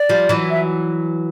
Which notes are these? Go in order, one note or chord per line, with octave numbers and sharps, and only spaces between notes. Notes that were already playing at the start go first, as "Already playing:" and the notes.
Already playing: D5
F3 G3
E3 F#3
E5